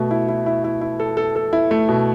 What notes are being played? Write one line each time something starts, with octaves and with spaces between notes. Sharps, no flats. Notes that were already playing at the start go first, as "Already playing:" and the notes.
Already playing: B2 A3
E4
E4
E4
E4
E4
A4
A4
A4
E4
A3
B2